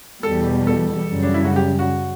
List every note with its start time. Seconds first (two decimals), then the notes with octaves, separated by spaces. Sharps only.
0.23 E2 B2 G3 A4
0.67 A4
1.11 F#2 C#3 G3
1.23 D4
1.34 E4
1.45 F#4
1.56 G4
1.79 F#4